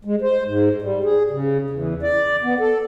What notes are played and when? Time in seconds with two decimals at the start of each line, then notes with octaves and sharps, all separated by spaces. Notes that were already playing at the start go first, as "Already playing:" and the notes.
0.05 G#3
0.22 C5
0.45 G#2
0.82 G3
1.04 G#4
1.30 C#3
1.70 E2
2.02 D5
2.43 B3
2.60 A4